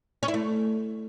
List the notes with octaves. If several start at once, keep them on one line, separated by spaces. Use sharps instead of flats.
C#4
E4
A3